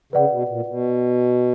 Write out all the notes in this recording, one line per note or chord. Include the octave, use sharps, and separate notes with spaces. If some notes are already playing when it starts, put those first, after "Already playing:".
C#3 B4 D5 F#5
B2
A#2
B2